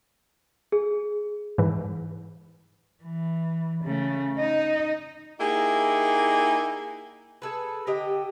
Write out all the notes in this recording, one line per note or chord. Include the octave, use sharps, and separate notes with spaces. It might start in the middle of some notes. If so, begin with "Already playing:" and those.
G#4
G#2 E3
E3
C#3 A3
D#4 D#5
A#3 D#4 E4 G4 G#4
G#4 A4 B4
D3 G4 D#5 G5